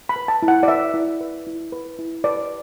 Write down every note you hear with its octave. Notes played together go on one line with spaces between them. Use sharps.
B5
B4
A5
E4
F#5
D5
B4 E5
E4
B4
E4
B4
E4
B4 D5